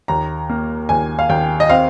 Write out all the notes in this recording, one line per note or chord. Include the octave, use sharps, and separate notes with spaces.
D#2 A#5
A#3
D#2 G#5
F5
D#2 G5
D#5
C4 F5